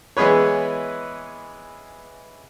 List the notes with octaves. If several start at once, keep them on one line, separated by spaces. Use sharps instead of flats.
E3 G#3 B3 G#4 B4 C#5